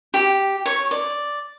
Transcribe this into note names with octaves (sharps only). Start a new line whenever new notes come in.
G4
C#5
D5